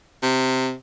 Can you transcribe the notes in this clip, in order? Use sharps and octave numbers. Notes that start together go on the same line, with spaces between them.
C3